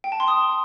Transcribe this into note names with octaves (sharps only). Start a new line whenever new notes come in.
G5
A5
C6
D#6